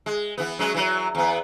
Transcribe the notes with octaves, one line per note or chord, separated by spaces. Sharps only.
G#3
E3 B3
F#3 G#3 C#4
E3 F#3
E2 B3